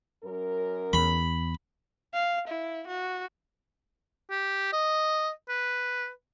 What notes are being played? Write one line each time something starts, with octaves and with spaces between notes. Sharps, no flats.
F#2 A#4
E2 B5
F5
E4
F#4
G4
D#5
B4